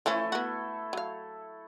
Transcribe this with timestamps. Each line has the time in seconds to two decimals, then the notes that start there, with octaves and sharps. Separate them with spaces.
0.06 E3 F3 A3 C#4 E4 A4
0.32 B3 F#4
0.93 F#3 F5